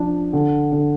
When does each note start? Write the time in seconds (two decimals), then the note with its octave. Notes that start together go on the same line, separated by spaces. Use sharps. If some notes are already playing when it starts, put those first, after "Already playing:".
Already playing: F3 D4
0.33 D3
0.72 D3